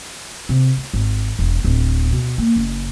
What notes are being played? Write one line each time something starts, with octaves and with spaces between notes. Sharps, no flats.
C3
A3
G#1
E1
D1
B2
A#3
F#1